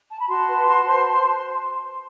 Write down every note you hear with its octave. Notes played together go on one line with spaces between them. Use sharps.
A5
B5
F#4 A5 C6
B4
F#4
C5